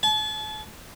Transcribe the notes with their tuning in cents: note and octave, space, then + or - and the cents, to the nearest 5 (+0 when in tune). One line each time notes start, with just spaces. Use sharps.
A5 -40